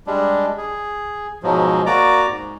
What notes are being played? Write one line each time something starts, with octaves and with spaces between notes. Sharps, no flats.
G3 G#3 D4
G#4
G#2 B2 F3 F#3 G#3
A#3 F#4 D5 A#5 D6
G#2